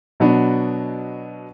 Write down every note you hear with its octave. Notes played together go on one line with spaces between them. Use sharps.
B2 F#3 B3 D4